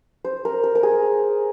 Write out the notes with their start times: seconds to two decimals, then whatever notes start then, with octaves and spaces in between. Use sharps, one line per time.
0.25 C5
0.45 A#4
0.64 A#4
0.75 A#4
0.83 G#4